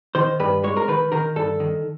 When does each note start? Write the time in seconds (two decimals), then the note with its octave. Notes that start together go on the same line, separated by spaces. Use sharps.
0.15 D#3 C5
0.40 G2 B4
0.64 G#3 C#5
0.77 A#4
0.88 D#3 B4
1.12 D#3 A#4
1.36 G2 A4
1.60 D#3